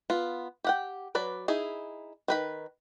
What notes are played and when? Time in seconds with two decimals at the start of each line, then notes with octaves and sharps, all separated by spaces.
0.10 B3 F4
0.64 G4 F#5 G5
1.15 F#3 B4 D5
1.48 D#4 E4 G#4
2.28 D#3 B4 B5